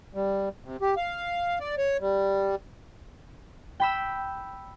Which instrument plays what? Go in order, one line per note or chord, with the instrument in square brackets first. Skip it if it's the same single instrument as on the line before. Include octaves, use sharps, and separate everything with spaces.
[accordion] G3
C3
G4
F5
D5
C#5
G3
[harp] G5 B5 E6